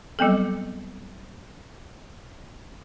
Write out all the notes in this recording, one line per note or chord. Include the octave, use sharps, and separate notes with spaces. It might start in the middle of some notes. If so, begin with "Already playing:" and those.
F#3 G3 B3 C4 A4